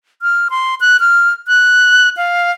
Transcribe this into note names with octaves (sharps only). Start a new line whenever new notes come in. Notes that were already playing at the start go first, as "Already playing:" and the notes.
F6
C6
F#6
F6
F#6
F5